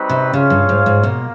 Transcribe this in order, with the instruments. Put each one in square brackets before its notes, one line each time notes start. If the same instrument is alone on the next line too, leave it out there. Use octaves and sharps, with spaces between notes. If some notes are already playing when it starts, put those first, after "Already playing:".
Already playing: [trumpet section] G3 C4 D#4 F#4 B4
[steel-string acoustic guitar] C3
[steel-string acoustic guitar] C#3 [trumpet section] F4 G#4 C#5 F5
[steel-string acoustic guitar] G2
G#2
G#2
[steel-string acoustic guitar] B2 [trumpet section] A#3